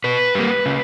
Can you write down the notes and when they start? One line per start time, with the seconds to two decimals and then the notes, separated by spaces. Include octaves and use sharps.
0.04 B2 B4
0.35 G3 A#3
0.66 C#3